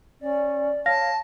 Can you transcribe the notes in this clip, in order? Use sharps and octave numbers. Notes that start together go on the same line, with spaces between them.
C#4 D5
C#5 F5 A5 A#6